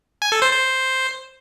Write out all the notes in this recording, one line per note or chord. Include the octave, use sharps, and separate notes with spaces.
G#5
A4
C5
C5